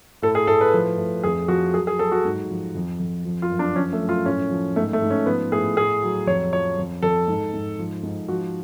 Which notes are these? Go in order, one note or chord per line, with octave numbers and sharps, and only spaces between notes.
A2 A4
G#4
A2 A4
B4
F3
A2
F2 G#4
F3 F#4
F#3 G#4
G#4
F#3 A4
F#4
G#2
F3
F2
F2
F3
F4
F#2
D4
F3 C#4
A3
F#2
F4
A2 C#4
F3
G#2 A3
A3
G#2
C#4
F3 B3
A2 G#4
A2 G#4
F#3
F2 C#5
F3 C#5
F2
F2 A4
G#2
G#2
F3
G#2
F3 F#4